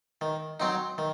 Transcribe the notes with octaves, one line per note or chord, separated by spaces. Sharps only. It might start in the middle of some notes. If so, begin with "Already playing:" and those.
D#3
F#3 C4 D#4
D#3